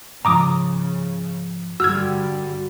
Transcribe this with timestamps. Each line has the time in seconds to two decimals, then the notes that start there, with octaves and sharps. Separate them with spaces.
0.25 G#2 C#3 F3 A#5 D6 D#6
1.80 G2 D3 G3 F#4 E6 F6 G#6